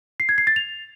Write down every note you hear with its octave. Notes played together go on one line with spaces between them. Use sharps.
C7
G#6
C7
A6
F7